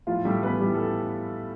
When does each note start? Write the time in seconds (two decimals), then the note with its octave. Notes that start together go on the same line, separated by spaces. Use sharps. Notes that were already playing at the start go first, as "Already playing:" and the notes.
0.07 A2 F3 F4
0.25 G3 A3 G4
0.43 E3 B3 B4
0.61 A2 G3 G4
0.74 A4